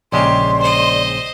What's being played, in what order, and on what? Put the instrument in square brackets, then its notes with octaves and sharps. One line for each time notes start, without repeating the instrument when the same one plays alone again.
[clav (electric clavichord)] A#1 C#3 G#3 [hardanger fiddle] G4 [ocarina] D5 [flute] C6
[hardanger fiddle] C5 D#5